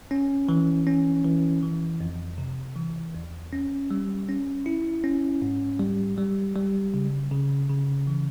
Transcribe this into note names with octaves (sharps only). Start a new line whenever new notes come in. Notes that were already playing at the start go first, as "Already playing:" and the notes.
C#4
E3
C#4
E3
E3
F2
C3
E3
E2
C#4
G3
C#4
E4
C#4
G#2
G3
G3
G3
C#3
C#3
C#3
E3